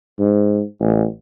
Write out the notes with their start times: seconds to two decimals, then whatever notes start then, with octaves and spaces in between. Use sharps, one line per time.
0.19 G#2
0.80 A1